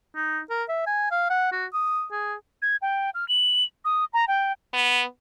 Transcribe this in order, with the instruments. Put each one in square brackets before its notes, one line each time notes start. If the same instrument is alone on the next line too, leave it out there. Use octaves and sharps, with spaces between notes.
[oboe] D#4
A#4
E5
G#5
F5
F#5
F#4
D#6
G#4
[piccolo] G#6
G5
F6
F#7
D#6
A#5
G5
[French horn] B3